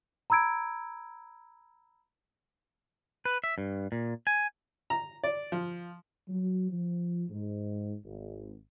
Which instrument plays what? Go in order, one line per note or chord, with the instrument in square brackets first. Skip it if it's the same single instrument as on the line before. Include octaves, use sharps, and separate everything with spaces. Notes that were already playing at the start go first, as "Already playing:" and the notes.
[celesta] A#5 B5 E6 G#6 D7
[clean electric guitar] B4
E5
G2
A#2
G#5
[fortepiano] A#5
D5
F3
[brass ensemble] F#3
F3
G#2
G#1